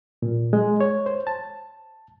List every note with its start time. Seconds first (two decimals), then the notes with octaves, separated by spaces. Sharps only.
0.22 A#2
0.53 G#3
0.81 C#5
1.06 C5
1.27 A5